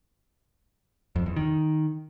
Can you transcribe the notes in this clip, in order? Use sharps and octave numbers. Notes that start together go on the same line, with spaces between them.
F2
E2
D#3